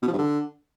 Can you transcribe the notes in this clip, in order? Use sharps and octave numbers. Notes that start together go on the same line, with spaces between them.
B2
F3
G2
D3